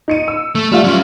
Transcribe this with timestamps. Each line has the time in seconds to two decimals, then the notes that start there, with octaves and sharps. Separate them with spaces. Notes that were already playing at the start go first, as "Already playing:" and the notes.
0.08 D#4 C#7 D#7
0.28 E6
0.55 A3
0.72 G3 A3 F4 E5
0.84 F#3 C#4